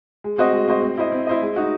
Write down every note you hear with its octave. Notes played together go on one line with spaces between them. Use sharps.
G#3
C4 F#4 C5 D#5
G#3
C4 F#4 C5 D#5
C4
E4 C5 D#5
C4
E4 C5 D#5
G#3
D#4 F#4